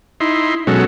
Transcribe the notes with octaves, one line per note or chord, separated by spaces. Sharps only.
D#4 E4 C6
B2 F#3 G#3 C#4 F#4 A4